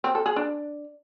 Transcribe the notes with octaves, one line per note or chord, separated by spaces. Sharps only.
C4
A4
G#4
D4